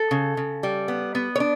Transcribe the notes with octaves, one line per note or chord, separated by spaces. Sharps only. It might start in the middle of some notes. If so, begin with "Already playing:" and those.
Already playing: A4
C#3
C#3
G3
B3
B3
C#5
D4